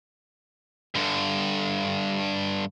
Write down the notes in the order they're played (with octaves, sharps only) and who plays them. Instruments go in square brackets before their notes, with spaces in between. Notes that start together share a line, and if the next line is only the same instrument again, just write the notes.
[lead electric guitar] G2 D3